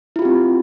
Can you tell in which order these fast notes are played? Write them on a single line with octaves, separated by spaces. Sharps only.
E4 F4 G4 C4